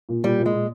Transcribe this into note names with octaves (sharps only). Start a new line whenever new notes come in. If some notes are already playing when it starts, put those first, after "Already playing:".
A#2
A#2 G3
A#2
G#3
A#2